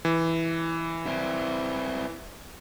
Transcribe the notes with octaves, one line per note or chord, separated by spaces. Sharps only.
E3
C4 E4